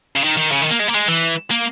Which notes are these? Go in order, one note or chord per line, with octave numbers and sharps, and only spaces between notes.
C#3
D#3
D#3
C#3
D#3
A#3
G#3
A#3
G#3
E3
A#3